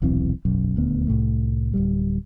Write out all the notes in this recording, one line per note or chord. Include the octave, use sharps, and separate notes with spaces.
D#1 B1 E3 C4
E1 B1 F#2
D#1 D2 B3
C2 A2 A3
D1 C2 G3